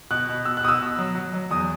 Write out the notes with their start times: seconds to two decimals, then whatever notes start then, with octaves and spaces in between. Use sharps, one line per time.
0.11 B2 F#6
0.29 B2
0.45 B2 E6
0.57 F#6
0.63 B2 D#6
0.68 E6
0.81 B2
0.99 F#3
1.15 F#3
1.34 F#3
1.51 E2 D#6